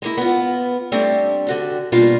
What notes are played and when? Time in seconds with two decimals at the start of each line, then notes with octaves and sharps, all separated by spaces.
0.02 G#3 A#3 E4
0.17 B3 F4
0.92 G3 A3 C4 D4
1.47 D3 F#4 G4
1.92 B2 G3 A#3 D4 F4